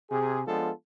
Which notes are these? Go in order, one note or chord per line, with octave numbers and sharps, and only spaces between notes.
C3 G#4
F3 G#3 B3 D4 F4 A4